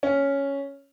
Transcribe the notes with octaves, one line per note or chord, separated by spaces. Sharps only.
C#4